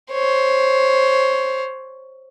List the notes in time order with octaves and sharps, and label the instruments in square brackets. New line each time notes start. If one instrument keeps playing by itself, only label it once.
[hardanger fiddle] C5 C#5